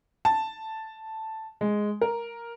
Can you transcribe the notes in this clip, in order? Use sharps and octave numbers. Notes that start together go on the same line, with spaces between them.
A5
G#3
A#4